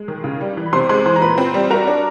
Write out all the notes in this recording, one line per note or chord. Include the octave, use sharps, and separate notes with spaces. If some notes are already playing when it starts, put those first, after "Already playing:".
Already playing: G#3
D#3
C#3
G3
E3
B5
C3 C5 C6
G#3 C5 C6
E3 C5 C6
A#5
A#2 B4 B5
C4
G3
F#4 A#4 A#5
D4